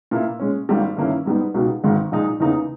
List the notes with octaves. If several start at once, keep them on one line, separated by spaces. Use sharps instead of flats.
A#2 A#3 E4
A#2 G#3 C#4
G#1 G#2 G3 A#3
G2 D#3 A#3 C#4 E4
G#2 G3 B3 D#4
C#2 B2 G#3 D#4 G4
G#1 G#2 D#3
A#1 A#2 G#3 D#4
E2 C#3 E3 A#3 D#4